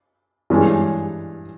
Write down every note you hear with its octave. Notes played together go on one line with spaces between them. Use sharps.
G2 E3 G#3 C#4